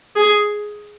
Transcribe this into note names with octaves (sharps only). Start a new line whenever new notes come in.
G#4